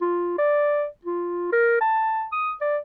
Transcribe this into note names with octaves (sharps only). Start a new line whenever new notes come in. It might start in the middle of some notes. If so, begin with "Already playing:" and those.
F4
D5
F4
A#4
A5
D#6
D5